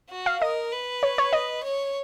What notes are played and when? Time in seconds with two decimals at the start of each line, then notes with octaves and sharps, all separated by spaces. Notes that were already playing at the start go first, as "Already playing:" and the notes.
0.10 F#4
0.26 F5
0.41 A#4 D#5
0.72 B4
1.03 C#5
1.18 C#5
1.33 D#5
1.64 C#5